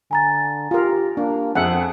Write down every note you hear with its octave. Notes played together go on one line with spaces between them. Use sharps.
D3 G#5 A#5 A6
F4 G4 A#4
A#3 D4
F2 C4 G#4 E5 F#5